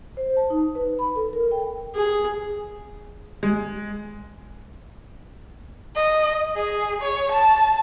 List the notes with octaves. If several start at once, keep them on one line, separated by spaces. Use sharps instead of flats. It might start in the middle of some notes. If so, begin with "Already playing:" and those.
C5
A5
D#4
B4
B5
A4
A#4
G5
G#4
G#3
D#5
G#4
C#5
A5